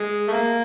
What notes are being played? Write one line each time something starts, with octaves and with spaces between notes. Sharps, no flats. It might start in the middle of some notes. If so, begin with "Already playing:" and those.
Already playing: G#3
A3
A#3